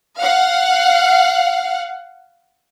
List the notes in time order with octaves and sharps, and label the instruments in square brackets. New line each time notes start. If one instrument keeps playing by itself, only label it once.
[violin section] F5 F#5